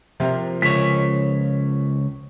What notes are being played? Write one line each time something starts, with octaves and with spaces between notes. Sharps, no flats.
C3 F3 A#3 A#4
C#2 C#5 B6